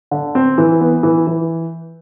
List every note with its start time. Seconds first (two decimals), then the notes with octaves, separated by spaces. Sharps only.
0.11 D3
0.35 C4
0.58 E3
0.81 B3
1.03 E3
1.27 E3